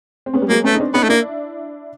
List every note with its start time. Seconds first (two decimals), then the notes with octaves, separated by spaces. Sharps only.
0.26 C4
0.34 B3 C#4
0.42 G3
0.49 F#3 G#3 A#3
0.64 A3 B3 C#4
0.75 D#4
0.80 C4 D4
0.94 B3 C#4 D#4
1.03 A3
1.09 A#3 D4 E4